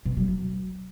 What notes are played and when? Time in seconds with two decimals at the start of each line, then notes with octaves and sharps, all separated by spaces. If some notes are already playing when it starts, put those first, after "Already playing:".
0.05 B2
0.17 F#3
0.28 F#3